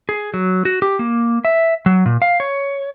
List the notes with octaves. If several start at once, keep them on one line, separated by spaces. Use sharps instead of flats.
G#4
F#3
F#4
G4
A#3
E5
F#3
A#2
F5
C#5